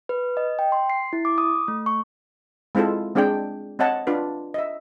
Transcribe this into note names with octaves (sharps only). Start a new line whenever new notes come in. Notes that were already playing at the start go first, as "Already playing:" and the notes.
B4
D#5
G5
C6
C7
E4
D6
D#6
A3
C#6
G#3 C4 E4 F4 A4
G#3 C4 D4 G#4 D5 G5
C4 C#5 D#5 F#5 A5
D4 F4 B4
D#5 E5